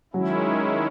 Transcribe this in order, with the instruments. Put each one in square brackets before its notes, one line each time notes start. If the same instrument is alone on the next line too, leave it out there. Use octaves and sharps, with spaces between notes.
[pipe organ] D#3 G#3 C#4 E4 [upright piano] F#3